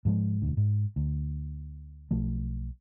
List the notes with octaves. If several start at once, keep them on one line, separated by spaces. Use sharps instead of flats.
G#2 F3 G#3
E1 D2
G#2
D2
B1 F3 A3